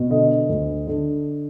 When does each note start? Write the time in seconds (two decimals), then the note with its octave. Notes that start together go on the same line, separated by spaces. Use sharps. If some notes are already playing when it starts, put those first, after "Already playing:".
Already playing: B2
0.10 D3 D#5
0.49 D2
0.87 D3